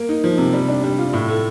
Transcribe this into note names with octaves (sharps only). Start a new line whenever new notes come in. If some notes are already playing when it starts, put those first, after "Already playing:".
Already playing: A#3
D#4
F3
C3
G3
D4
G3
F4
A2
A3